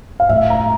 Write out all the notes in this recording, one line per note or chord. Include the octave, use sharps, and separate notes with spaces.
F5
A2 E5
A#5